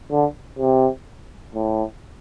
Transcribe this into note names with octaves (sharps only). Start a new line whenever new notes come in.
D3
C3
A2